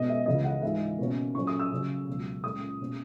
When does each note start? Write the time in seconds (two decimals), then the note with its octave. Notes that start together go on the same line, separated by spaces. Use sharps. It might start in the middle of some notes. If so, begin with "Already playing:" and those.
Already playing: B2 G#3 B3 D#5
0.09 E5
0.26 C#2 C#3 E3 D#5
0.44 F#5
0.62 G#2 E3 G#3 D#4 E5
0.98 B2 A#3 C#4
1.34 A#2 F#3 C#4 C#6
1.47 D#6
1.59 E6
1.72 C#3 F#3 C#4
2.08 C#2 B2 F#3
2.44 A#2 G#3 C#4 D#6
2.80 B2 A#3 C#4